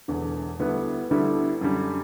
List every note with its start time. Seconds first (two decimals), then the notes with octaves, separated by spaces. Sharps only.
0.08 E1 E2 D3
0.59 D2 D3 G3 B3 E4
1.10 D2 D3 G3 B3 E4
1.61 F#2 D3 G3